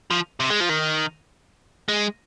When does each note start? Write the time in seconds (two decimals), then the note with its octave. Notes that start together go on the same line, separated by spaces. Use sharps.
0.11 F3
0.40 C3
0.50 G#3
0.61 F3
0.70 D#3
1.88 G#3